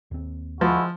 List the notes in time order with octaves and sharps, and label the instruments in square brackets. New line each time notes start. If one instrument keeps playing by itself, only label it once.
[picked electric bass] D#2 C4
[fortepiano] F3 [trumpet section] G#3 E4 F#4